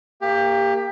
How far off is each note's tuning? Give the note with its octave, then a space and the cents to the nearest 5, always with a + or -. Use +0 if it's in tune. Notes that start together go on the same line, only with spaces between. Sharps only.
A#3 -15 G4 +20